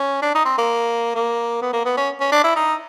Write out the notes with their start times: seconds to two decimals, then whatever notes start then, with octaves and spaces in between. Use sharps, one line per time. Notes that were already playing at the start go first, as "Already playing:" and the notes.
Already playing: C#4
0.22 D4
0.35 D#4
0.45 C4
0.58 A#3
1.15 A#3
1.62 B3
1.73 A#3
1.85 B3
1.97 C#4
2.20 C#4
2.32 D4
2.44 E4
2.56 D#4